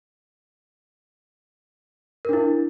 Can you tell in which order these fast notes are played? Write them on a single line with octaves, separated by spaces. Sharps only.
A#4 D4 E4